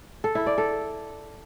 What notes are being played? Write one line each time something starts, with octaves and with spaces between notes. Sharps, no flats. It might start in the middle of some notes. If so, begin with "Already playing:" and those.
A4
E4
D5
A4